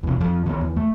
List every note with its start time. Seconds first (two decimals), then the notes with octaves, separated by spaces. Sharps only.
0.03 E2 C3
0.20 F2 F3
0.46 D#3 B3
0.61 E2
0.76 A3